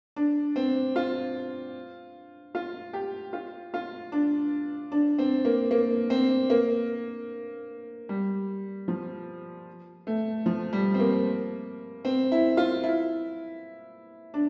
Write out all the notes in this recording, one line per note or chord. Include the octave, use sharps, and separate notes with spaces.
D4
C4
F4
F4
G4
F4
F4
D4
D4
C4
A#3
A#3
C4
A#3
G3
F3
A3
F3
G3
C4
A#3
C4
E4
F4
E4
D4